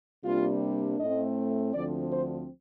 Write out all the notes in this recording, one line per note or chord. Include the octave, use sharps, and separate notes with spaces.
C3 G3 A#3 D4 F4
A2 A3 C4 D#5
D2 D3 F3 C4 D5
C5